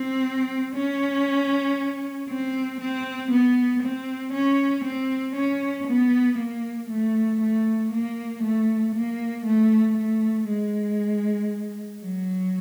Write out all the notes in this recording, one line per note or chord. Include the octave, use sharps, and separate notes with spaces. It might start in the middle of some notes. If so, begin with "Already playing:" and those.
Already playing: C4
C#4
C4
C4
B3
C4
C#4
C4
C#4
B3
A#3
A3
A3
A#3
A3
A#3
A3
A3
G#3
F#3